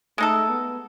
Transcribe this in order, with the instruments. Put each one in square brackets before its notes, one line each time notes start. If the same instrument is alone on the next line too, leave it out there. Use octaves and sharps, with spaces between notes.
[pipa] G#3 D#4 A4 [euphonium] A3
[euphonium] B3